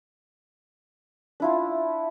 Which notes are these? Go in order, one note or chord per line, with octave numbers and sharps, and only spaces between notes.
D4 E4 F4